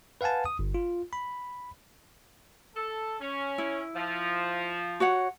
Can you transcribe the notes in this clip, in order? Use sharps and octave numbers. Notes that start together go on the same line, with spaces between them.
B4 F5 F#5 G#5 A5
D#6
G1
F4
B5
A4
C#4
E4
F3
F#4 C#5 F#5